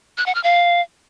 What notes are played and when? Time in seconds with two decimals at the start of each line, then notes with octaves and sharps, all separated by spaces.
0.18 F#6
0.26 F#5
0.35 F6
0.44 F5